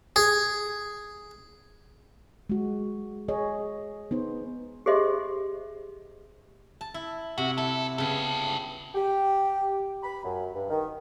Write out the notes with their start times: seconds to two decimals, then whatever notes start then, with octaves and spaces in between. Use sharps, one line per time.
0.16 G#4
2.50 G#3 F#4
3.28 G#4 C#5 D#5
4.11 B3 D#4 C5
4.86 G4 G#4 C5 D#5 E5 C6
6.81 A5
6.94 E4
7.38 C3 F#4
7.58 E4 A4
7.98 C#3 B3 G4 A4
8.95 G4
10.03 B5
10.24 F#2
10.54 G2
10.69 D#3